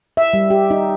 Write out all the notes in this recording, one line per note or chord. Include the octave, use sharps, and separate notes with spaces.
E5
G3
G4
D#4